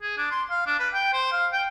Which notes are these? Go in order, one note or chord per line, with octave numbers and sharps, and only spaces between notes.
G#4
D4
C6
F5
D4
B4
G5
C5
F5
G5